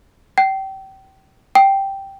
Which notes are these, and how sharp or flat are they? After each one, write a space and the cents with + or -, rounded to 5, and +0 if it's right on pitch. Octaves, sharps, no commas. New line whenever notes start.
G5 -30
G5 -5